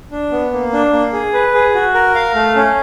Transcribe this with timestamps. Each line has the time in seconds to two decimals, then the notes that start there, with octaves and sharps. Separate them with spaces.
0.11 D4
0.32 B3
0.53 A#3
0.73 D4
0.93 A#3
1.13 G#4
1.34 B4
1.54 G#4
1.74 F#4
1.94 A#4
2.15 F5
2.35 A3
2.56 C#4